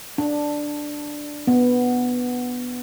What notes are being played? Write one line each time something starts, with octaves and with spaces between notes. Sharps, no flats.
D4
B3